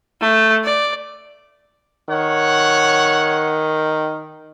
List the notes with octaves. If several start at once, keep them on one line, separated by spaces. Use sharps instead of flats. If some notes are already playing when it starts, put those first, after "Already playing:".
A3
D5
D#3 C#5 F#5